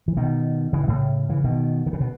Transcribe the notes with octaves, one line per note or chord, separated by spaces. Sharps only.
E3
B2 D#3
C#3 E3
B2
A2 C#3
C#3 E3
B2 D#3
D#3
C#3
B2